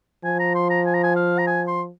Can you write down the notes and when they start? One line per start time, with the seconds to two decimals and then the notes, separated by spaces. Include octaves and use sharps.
0.24 F3 G#5
0.40 A#5
0.55 C6
0.70 A#5
0.86 G#5
0.94 A#5
1.03 G#5
1.16 F5
1.38 A#5
1.47 G#5
1.67 C6